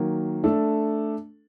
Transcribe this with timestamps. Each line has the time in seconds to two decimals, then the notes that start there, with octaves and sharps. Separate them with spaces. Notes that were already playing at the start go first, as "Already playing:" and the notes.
Already playing: D#3 F#3 A#3
0.44 A3 D4 A4